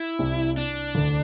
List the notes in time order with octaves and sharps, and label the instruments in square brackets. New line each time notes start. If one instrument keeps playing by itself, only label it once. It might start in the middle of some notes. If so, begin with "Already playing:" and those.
Already playing: [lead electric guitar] E4
[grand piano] C2 C3
[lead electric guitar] D4
[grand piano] D2 D3